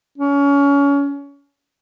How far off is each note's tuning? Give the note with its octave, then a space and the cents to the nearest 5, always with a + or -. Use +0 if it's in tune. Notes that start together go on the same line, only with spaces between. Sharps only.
C#4 +25